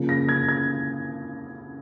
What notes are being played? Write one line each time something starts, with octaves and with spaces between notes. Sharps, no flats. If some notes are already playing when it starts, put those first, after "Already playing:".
Already playing: C#3 F3 A#3
A#6
G#6
G#6